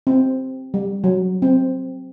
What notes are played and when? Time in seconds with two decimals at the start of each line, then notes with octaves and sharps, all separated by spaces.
0.07 C4
0.74 G3
1.04 F#3
1.42 C4